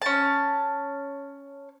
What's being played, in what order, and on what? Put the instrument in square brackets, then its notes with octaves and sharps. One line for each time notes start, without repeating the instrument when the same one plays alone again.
[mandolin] C#4 A5